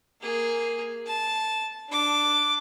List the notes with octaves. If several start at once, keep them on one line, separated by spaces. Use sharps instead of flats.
A#3 G#4
A5
D4 D6